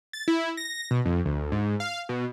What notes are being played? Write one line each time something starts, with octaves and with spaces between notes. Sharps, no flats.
A6
E4
A#6
B2
F2
D2
G#2
F5
B2